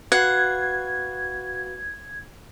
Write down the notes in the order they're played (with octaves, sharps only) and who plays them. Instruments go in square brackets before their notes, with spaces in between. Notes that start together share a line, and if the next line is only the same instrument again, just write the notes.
[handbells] F#4 B4 F5 [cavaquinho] F#5 [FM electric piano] G#6